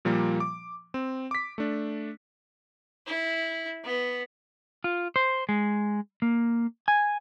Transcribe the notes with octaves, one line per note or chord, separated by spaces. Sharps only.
A#2 F3 G3 A#3
D6
C4
D6 B6
A3 D4
E4
B3
F4
C5
G#3
A#3
G#5